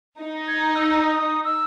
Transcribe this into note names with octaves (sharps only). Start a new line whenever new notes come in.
D#4
G#6
E6
D#6
E6